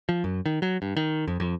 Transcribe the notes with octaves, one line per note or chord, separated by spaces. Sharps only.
F3
F#2
D#3
F#3
G2
D#3
F2
F2